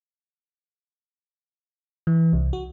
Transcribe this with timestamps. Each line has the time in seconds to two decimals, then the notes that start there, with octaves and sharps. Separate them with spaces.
2.07 E3
2.33 C2
2.53 F#4